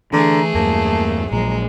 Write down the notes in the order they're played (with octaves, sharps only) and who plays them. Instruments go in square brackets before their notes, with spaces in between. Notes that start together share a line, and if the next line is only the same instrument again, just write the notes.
[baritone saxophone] D3 [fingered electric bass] E3 [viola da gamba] A3 G#4 [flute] A#5
[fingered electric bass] E2 G2 F#3 [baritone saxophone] A#3 [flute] A5
[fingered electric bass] A#1 A#2 F#3 [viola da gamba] G#3 [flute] A#5